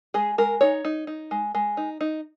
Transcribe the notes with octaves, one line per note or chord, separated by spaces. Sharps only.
G#3 G#4
G#3 A#4
D#4 C#5
D#4
D#4
G#3
G#3
D#4
D#4